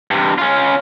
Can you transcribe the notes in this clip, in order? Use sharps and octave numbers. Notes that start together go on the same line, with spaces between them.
G2 C3
C#4 F4